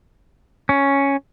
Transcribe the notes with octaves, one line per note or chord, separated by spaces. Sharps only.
C#4